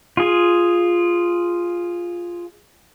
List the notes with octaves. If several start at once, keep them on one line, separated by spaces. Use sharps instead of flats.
F4 G#4